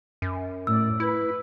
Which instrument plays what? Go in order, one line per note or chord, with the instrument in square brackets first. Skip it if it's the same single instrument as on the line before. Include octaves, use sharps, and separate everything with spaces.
[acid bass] F#2
[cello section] A2 D5 [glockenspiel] E6
[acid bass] E4 [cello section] B4